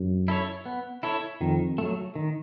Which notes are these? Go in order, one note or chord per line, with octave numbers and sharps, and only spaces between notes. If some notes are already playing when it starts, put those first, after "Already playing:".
Already playing: F#2
E4 A4 C#5
B3
E4 A4 C#5
F2 D#3
F#3 A3
D#3